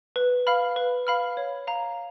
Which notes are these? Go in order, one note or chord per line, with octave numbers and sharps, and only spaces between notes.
B4
F5 B5 F6
B4
F5 B5 F6
C#5
F5 A#5